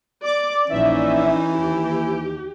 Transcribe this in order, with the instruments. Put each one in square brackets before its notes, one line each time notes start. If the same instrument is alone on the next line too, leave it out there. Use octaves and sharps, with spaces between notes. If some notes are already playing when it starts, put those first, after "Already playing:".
[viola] D5 [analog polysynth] D6
[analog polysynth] A#1 D5 E5 [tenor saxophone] E3 [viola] C#4 D#4
[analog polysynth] D#2 [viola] G4